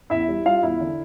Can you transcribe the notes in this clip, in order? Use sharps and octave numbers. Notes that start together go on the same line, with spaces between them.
E2 E4 E5
G3
G3 F4 F5
E2 E4 E5
D3